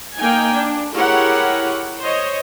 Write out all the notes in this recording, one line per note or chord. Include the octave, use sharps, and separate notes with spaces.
A#3 D#4 G5 G#5
D4
E4 G4 G#4 A#4 C#5 F#5
C5 C#5 D#5